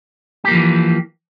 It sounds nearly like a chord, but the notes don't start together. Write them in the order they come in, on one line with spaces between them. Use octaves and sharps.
G4 A#3 F3 E3